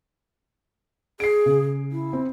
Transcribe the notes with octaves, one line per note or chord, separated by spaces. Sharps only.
G#4 C7 D7
C#3
E4
C4